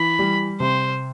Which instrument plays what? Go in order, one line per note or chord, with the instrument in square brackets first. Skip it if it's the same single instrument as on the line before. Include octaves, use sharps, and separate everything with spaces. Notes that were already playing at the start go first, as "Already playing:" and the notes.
Already playing: [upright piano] E3 [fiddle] B5
[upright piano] G3
[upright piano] C3 [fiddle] C5